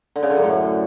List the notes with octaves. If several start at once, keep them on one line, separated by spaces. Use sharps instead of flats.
D3
C#3
D3
F#2
A2